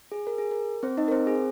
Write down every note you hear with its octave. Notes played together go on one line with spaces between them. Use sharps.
G#4
A#4
G#4
A#4
C4 C5
D#4 D#5
A#4
C4 C5
G#4